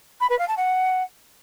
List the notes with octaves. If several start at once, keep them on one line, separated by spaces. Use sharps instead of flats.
B5
B4
F5
A5
F#5